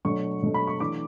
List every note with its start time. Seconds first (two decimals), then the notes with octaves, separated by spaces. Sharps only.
0.05 B2 F#3 A3 D4 C#6
0.43 B2 F#3 A3 D4
0.54 B5
0.67 C#6
0.80 E3 A3 D4 D6